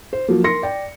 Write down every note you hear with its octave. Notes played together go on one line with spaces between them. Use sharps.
C5
F3 F#3 A#3
A#4 C6 A#6 C#7
D5 G5